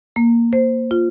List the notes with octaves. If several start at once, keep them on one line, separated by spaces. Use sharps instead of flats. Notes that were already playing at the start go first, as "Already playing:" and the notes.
A#3
C5
F4